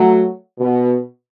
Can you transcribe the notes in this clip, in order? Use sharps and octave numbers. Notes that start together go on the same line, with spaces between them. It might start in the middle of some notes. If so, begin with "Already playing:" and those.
Already playing: F#3 A3
B2